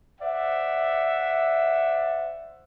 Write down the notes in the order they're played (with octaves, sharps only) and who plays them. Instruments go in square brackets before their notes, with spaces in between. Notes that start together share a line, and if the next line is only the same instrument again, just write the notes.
[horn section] C5 D5 E5 F#5